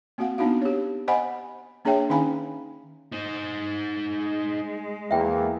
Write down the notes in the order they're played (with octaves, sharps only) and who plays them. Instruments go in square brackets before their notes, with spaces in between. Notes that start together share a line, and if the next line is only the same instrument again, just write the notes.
[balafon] A#3 C4 F#4 F5 F#5
B3 D4 D#4 F#4 F5
G4 C#5
C5 D#5 F#5 G#5 B5
A#3 D4 G#4 C#5 E5 G5
D#3 C#4 D#4 F5 G#5 B5
[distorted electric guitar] D#4 C5
[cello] G#3
[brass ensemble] E2 A#3 [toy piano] E5 G5